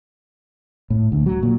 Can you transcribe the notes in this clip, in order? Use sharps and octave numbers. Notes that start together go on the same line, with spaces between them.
A2
D2
F#3
A#2